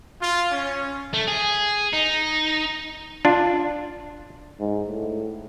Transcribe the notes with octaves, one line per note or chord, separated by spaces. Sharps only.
F4
C#4
A3
G#4
D#4
D4 F4
G#2
A2